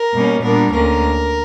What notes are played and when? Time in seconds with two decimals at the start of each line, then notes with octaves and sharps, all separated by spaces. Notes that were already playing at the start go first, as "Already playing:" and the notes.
Already playing: A#4
0.13 B2 G3 A#3 C#4
0.43 A#2 G3 B3 D4 A#4
0.73 D2 D3 A#3 C#4 A#4